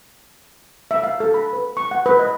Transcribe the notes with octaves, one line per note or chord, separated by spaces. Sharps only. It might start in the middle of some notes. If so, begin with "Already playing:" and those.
E5
F5
A4
B5
B4
C#6
F#5
B4
D#5